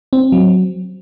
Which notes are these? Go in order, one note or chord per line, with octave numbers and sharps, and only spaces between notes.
C4
F#3